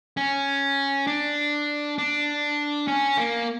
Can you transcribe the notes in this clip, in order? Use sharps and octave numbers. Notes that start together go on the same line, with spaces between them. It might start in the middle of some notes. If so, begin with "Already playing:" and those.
C#4
D4
D4
C#4
A#3